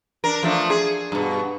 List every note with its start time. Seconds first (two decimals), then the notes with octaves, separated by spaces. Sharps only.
0.24 D4 A#4
0.43 F3 A3 D4
0.70 G#4
1.12 G2 B2